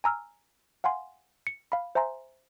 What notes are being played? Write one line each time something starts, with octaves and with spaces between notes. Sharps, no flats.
G#5 A#5 E6 F6
F5 F#5 G#5 C6
C#7
F5 B5
C5 E5 G#5 A#5 C6